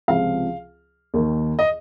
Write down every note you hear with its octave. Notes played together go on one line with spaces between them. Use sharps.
C#2 C3 F3 F5
D#2 D#3
D#5